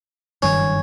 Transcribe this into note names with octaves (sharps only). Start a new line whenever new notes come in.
F#1 G2 D#3 C#4